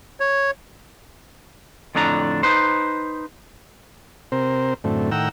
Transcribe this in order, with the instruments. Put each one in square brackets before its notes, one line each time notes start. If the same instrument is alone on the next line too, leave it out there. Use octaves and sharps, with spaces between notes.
[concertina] C#5
[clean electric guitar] F2 A2 D3 D4 A#5
D#4 B4 C5
[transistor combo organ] C3 C4 A#4 C5
F#2 A2 D3 A3 C4
A2 D#3 F#5 G5 A#5 E6